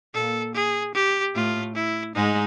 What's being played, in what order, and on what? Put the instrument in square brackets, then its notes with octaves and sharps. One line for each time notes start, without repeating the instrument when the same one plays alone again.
[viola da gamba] A#2 A#3 [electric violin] A4
[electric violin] G#4
G4
[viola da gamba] A2 A3 [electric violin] F4
[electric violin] E4
[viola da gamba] G#2 G#3 [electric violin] D#4